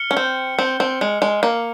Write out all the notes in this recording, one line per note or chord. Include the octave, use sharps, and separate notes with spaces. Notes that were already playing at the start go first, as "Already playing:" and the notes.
Already playing: F6 C#7 G7
C#4
C4
C4
C4
G#3
G#3
A#3